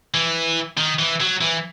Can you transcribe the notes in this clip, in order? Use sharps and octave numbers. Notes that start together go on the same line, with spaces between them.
E3
D#3
E3
F#3
E3